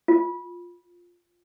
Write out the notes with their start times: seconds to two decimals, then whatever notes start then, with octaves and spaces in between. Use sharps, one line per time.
0.08 F4